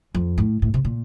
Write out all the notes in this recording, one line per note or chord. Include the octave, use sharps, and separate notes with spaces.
F2
A2
A2
C3
A#2